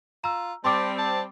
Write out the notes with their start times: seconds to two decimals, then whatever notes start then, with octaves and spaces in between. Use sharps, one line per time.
0.24 F4 A#5 E6
0.64 G3 C4 A5 C6 D6
0.98 A5